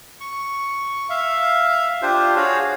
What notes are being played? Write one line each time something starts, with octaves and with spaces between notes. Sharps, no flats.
C#6
E5 F5
D4 F4 G4 C5
F#4 G#4 C#5 F5